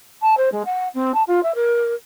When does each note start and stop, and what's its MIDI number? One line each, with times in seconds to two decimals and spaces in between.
0.22 0.35 81
0.37 0.49 72
0.52 0.63 56
0.65 0.88 78
0.94 1.14 60
1.14 1.23 81
1.27 1.40 65
1.43 1.55 76
1.55 1.94 70